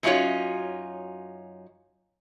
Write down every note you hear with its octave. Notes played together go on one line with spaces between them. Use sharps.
F#2 C#4 D#4 F4 F#4 C#5